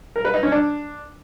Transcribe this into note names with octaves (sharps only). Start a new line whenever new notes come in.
A#4
B4
D#4
C#4
D4